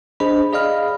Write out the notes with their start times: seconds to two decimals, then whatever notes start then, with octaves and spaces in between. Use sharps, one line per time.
0.20 D4 G#4 C5 D#5 B5
0.52 G#4 D5 D#5 F5 B5 F6